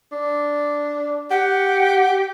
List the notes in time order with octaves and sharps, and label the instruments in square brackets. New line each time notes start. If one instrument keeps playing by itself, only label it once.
[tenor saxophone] D4
[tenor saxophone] G4 [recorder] F#5